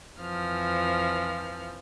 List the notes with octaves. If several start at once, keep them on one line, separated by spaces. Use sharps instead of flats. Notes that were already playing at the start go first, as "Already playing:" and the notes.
F2 E3 F3 F6